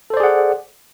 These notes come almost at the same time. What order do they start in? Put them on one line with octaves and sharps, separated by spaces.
A4 C5 D5 G#4 F#5